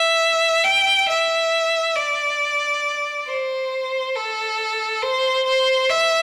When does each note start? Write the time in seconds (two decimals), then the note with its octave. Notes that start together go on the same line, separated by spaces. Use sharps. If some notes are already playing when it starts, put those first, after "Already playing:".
Already playing: E5
0.64 G5
1.08 E5
1.96 D5
3.27 C5
4.15 A4
5.02 C5
5.46 C5
5.90 E5